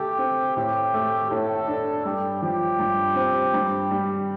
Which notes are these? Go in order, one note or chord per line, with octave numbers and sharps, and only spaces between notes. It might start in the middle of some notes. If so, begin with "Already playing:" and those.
Already playing: D3 A3 G4 A4
C4
A2 G4
A3
A2 A4
D4
G2 G4
F3 G4
G2
C4
G2
G3